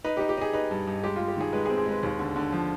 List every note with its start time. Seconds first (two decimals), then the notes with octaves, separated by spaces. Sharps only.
0.04 D#4 B4
0.17 G4
0.21 D#4
0.29 G4
0.37 D#4 G#4
0.53 D#4 B4
0.71 G2
0.87 G2
1.03 G#3 G4
1.16 G#3 F4
1.28 G4
1.37 D#3 G#4
1.53 G#3 B4
1.66 G#4
1.70 C4
1.78 G#4
1.86 G#3 B4
2.03 D#2
2.19 D3
2.36 D3
2.52 F3